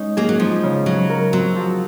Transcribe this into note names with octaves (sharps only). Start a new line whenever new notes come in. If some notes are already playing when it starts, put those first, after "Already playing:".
Already playing: G#3 C#4 D#4
F#3 A#3 G#4
F#3
F3 D#4
C#3
F#3 F#4
A#4
F#3 C4
F3